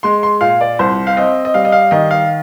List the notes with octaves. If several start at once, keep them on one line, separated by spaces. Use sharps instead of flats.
G#3 C6
C6
A#2 F5
D5
C2 C5
F5
C4 D#5
D#5
G3 F5
D#5
F5
D#3 D#5
F5